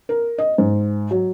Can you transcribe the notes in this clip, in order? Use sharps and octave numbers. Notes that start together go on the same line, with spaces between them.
A#4
D#5
G#2
F#3